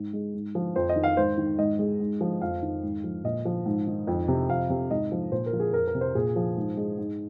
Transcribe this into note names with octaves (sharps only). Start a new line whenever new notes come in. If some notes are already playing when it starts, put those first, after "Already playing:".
Already playing: G#2
G#3
G#2
F3
F2 C5
D#5
D#3
F5
G#2 C5
D#3
G#2 D#5
G#3
G#2
F3
F2 F5
D#3
G#2
F3
A#2 D#5
F3
G#2
D#3
F2
C3
F2 F5
C3
G#2 D#5
F3
A#2 C5
A#4
F3
G#4
F2 A#4
A#4
C3
C5
A#2 G#4
F3
G#2
G#3
G#2